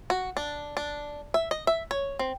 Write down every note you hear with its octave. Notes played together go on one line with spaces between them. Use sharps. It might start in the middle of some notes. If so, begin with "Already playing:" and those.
F#4
D4
D4
E5
D#5
E5
C#5
C4